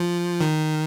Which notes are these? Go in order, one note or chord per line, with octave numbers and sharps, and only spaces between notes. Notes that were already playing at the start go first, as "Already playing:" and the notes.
Already playing: F3
D#3